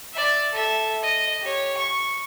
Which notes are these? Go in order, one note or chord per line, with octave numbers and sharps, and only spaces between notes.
D5 E5
A4 E5
D#5
G4 C#5
C#6